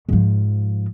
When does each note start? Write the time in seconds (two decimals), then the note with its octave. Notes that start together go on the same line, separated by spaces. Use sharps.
0.09 G#2 F3